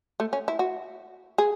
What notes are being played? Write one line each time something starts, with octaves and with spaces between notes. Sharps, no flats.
A3
C#4
E4
F#4
G#4